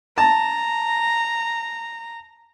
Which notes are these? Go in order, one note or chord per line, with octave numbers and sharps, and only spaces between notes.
A5 A#5